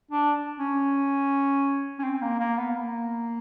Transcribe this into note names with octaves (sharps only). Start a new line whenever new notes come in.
D4
C#4
C#4
C4
A#3
A#3
B3
A#3